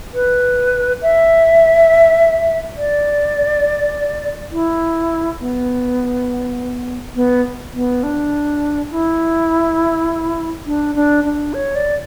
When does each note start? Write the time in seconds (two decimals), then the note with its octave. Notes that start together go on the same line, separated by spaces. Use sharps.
0.14 B4
1.02 E5
2.77 D5
4.52 E4
5.40 B3
7.15 B3
7.74 B3
8.03 D4
8.91 E4
10.66 D4
10.95 D4
11.24 D4
11.54 C#5
11.75 D5